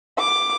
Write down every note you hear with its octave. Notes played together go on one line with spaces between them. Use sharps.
D6